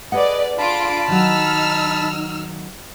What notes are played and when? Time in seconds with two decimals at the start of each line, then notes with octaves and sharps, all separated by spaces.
0.12 G#4 A4 B4 D5 D#5 F#5
0.58 D4 F4 A5 B5 D7
1.08 D#3 F#3 D#4 E6 F6